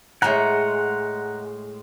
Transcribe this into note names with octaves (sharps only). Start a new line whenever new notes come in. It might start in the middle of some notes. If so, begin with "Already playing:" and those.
A2 G#3 F#5 A#5